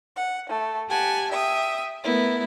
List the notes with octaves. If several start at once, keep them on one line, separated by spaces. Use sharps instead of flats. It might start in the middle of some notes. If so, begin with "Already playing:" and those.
F#5
A3
G4 F#5 G#5 A5
E5 G5 D#6
A3 B3 E4 A#4